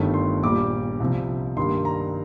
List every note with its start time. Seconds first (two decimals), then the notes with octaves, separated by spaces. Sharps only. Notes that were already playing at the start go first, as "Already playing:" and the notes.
Already playing: G1 G2 D#3 A3
0.14 C6
0.43 A#1 A#2 G3 D6
1.00 C2 C3 F3
1.57 G2 D#3 G3 A#3 C6
1.85 A#5